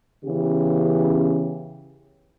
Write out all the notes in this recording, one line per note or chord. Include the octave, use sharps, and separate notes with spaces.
C#3 E3 B3 C#4 G4